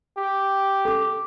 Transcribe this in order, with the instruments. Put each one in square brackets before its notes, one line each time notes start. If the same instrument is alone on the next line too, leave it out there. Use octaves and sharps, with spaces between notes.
[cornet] G4
[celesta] A4 D6